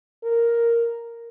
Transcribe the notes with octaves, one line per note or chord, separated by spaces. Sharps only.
A#4